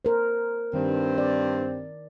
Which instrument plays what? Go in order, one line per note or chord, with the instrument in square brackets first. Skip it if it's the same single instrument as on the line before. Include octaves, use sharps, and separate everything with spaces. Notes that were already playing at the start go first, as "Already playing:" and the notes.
[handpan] A#4 C5
[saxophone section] G2 C4 [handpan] D#3
[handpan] D5